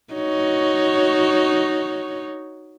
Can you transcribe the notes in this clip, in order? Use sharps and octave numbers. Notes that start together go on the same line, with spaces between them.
D#4 F#4 C#5